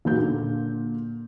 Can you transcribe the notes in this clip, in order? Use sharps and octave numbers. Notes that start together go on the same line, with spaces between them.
F#1 D#2 A#2 F#4 G6
A#2 D3